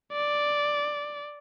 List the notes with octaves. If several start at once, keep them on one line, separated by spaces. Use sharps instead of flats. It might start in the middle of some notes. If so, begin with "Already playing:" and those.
D5